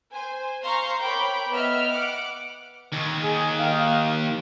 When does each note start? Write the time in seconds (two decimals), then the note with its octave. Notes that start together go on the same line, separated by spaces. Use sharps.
0.12 C5 G#5
0.62 C5 F5 A#5 C6 C#6
1.01 A#4 C#5 G5 B5 D6 G6
1.50 B3 D#5 E5 F6
1.91 F#5 D6
2.93 D#2
3.23 G#4
3.59 D#3 F5